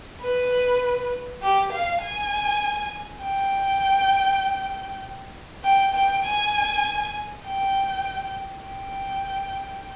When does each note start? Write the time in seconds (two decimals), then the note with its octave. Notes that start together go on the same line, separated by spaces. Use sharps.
0.21 B4
1.42 G4
1.72 F5
2.02 G#5
3.23 G5
5.64 G5
5.94 G5
6.24 G#5
7.45 G5
8.66 G5